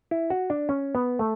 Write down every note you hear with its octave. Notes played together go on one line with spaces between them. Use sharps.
E4
F#4
D4
C#4
B3
A3